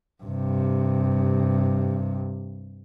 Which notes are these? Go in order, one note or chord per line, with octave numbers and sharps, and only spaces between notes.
G2 C3